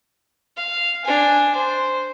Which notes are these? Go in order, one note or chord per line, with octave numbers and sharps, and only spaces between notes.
F5
D4 G#5
C5